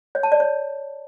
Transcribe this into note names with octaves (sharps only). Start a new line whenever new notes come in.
C#5
A5
D5
C#5